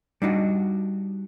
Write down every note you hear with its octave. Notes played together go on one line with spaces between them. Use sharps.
G3 D4 D#4 F#4